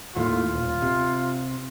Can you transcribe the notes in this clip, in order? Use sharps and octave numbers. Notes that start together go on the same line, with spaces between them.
D#2 A2 F4
D#1
C3